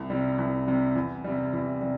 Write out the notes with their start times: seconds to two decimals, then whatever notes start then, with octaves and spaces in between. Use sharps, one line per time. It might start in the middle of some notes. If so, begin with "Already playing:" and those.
Already playing: C2
0.10 C3 G3
0.38 C2
0.68 C3 G3
0.95 E2
1.24 C3 G3
1.53 E2
1.81 C3 G3